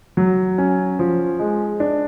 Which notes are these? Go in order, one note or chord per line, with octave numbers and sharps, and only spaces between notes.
F#3
C#4
F3
G#3
D4